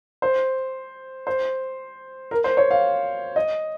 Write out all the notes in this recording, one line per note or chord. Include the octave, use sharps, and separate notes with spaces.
C5
C5
A#4
C5
C#5
F5
D#5